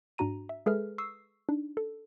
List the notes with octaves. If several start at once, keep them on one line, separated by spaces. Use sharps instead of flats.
G#2 D4 F#4 A#5 D#7
E5
G#3 G#4 A4 B4 E5 F6
C#6 D#6 E6 C7
D4 D#4
A4